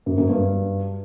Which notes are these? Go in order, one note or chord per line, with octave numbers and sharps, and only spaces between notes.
F#2
F#2
G2